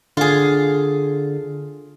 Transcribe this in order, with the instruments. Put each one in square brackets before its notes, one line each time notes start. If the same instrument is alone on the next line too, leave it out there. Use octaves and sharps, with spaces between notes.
[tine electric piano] D3 [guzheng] F4 G#4